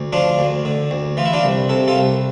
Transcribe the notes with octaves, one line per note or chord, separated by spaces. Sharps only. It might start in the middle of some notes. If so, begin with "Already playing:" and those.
Already playing: D2
F3 D4 F4
D2
D3
D2
E3 F4
E4
D4 F4
C2
C3 A4
F4 A4
C2